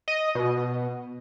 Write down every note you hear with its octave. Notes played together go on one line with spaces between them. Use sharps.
D#5
B2